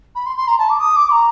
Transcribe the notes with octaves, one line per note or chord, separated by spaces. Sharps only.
B5
C6
C6
A#5
A5
D6
D#6
D6
A#5